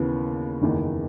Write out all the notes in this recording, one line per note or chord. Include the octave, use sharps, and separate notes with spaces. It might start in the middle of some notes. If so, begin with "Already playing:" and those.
Already playing: D#2 C#3 E3 B3
F#1 E2 D#3